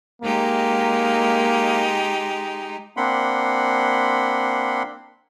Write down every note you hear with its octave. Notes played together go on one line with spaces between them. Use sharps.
G#3 A#3 D#4 G4
A#3 C4 D4 F#5 B5 C6